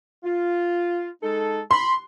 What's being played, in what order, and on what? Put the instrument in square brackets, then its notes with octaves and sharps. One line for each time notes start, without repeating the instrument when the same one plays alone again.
[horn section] F4
G#3 D#4 A4
[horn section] B5 [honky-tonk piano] C6